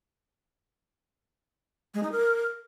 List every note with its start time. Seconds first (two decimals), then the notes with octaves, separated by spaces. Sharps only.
1.94 G#3
2.03 D#4
2.12 A#4